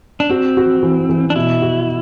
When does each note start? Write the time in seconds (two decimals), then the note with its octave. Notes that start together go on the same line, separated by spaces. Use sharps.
0.20 D4
0.30 C4 F#4
0.57 F#4
0.83 E3
1.09 E3
1.30 D4
1.36 B2 E4
1.62 F#4